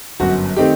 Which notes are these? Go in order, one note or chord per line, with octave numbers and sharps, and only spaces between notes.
G1 F#2 F#3 F#4
D#3 A3 C4 D#4 G4